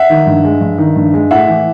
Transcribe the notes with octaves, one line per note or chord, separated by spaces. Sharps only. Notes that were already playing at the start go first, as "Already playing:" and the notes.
Already playing: E5 F#5
D#3
G2
G#3
G2
D#3
G2
G#3
A2 E5 F#5
E3